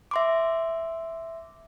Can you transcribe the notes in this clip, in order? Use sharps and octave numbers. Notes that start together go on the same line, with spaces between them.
E5 C6 D6